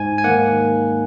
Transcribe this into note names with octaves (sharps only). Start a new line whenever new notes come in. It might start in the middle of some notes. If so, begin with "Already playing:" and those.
Already playing: G#2 G#5
G#5
D#3 A#3 F#5